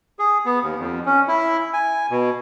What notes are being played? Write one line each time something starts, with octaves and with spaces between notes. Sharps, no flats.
G#4
B3
D#2
F2
C#4
E4
G#5
B2